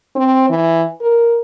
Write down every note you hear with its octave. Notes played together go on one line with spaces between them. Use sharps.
C4
E3
A#4